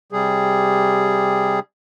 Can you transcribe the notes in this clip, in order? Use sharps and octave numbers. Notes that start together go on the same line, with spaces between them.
C3 G3 G#4